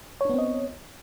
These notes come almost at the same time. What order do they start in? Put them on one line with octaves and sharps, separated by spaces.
C#5 D4 B3 C4 D#5